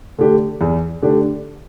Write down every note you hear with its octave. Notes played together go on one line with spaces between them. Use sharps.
D3 A3 D4 G4
E2
D3 A3 D4 G4